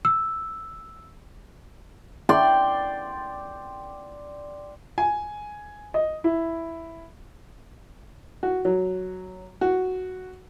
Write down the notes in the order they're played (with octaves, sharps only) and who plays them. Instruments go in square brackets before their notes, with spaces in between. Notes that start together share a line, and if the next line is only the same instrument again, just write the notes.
[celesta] E6
[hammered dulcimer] D5 G5 C6
[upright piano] G#5
D#5
E4
[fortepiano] F#4
F#3
F#4